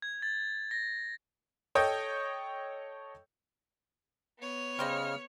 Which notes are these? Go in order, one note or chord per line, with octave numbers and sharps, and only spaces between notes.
G#6
A6
A#6
A4 C#5 D#5 G5 D#6 G6
B3 C#5
C#3 G3 C5 D#5 F6